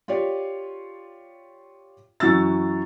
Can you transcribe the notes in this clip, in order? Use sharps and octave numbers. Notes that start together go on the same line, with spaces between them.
F4 G4 C#5 D5
F#2 E3 F#4 E6 A6